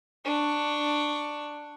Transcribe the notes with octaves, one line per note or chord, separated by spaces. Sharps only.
D4 C#6